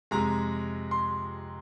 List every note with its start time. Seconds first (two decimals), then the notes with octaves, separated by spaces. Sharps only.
0.11 F2 C3 G#3 A#5
0.91 C6